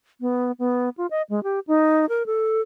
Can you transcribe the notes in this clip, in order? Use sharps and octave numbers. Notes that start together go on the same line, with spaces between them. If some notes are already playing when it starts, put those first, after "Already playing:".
B3
B3
F4
D#5
G#3
G4
D#4
A#4
A4